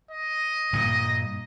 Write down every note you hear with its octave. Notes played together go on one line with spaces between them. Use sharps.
D#5
G2 A#2